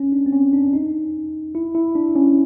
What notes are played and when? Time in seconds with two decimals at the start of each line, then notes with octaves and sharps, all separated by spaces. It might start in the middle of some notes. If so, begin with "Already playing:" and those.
Already playing: C#4
0.12 D4
0.26 C4
0.33 C#4
0.53 D4
0.67 D4
0.73 D#4
1.55 E4
1.75 E4
1.95 D4
2.16 C#4